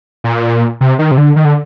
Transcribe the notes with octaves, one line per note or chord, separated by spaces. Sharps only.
A#2
C3
D#3
C3
D3
D#3
D3